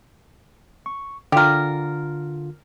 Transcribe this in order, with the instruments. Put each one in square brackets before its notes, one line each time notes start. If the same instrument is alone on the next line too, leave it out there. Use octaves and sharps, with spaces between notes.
[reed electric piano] C#6
[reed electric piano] D3 F4 [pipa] G4 A#4